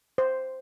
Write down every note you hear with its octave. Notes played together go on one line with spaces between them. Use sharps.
C5